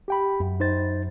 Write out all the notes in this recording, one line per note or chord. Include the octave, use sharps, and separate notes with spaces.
G4 G5 B5
F#2
D#4 C5 A6